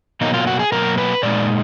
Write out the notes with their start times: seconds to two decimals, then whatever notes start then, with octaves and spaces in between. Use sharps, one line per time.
0.21 B2 F#3 A#3 D#4
0.34 F4
0.47 F#4
0.59 G#4
0.72 B2 F#3 A#3 A#4
0.98 B4
1.23 A#2 G#3 D#4 D5